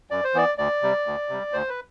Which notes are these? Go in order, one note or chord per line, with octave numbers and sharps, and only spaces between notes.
F#2 D5
C5
E3 B3 D5
D2 D5
C3 G3
D2
C3 G3
D2 C5
B4